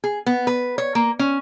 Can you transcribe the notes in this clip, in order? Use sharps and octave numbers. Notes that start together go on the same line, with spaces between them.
G#4
B3
B4
C#5
A#3
C#4